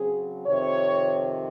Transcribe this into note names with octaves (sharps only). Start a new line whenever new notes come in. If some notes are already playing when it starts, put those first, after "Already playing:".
Already playing: C#3 F#3 C4 G#4
F2 C3 D#3 C#5